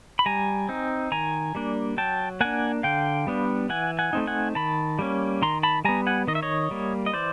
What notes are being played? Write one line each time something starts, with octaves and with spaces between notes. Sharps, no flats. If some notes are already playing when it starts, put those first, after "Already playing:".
B5
G3 G#5 A#5
C4 D#4
D#3 G#5 A#5
G3 A#3 D4
F#3 G5 A5
A#3 D4 F#5 G#5
D3 F5 G5
G3 B3 D4
E3 F#5 G#5
F#5 G#5
A3 C4 D#4
F#5 G#5
D#3 A5 B5
G3 A#3 C#4
D#3 A#5 C6
A5 B5
G3 B3 G#5 A#5
F#5 G#5
D#3 D#5
E5
C#5 D#5
G3 A#3
D#5
E3 C5 D5